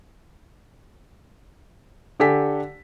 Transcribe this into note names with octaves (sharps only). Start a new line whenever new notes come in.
D3 G4 A4 G#5 B6